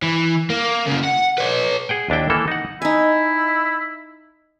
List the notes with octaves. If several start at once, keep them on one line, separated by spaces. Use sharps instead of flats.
E3
A#3
C#3 A#3
F#5
B4 C#5
G#4 F#5 G5
D#2 D4 E4 G5
E3 A#3 A4
D#4 F#5
D#4 E4 G#5